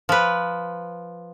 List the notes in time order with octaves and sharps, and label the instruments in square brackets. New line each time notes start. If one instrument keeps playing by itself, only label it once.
[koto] F3 B4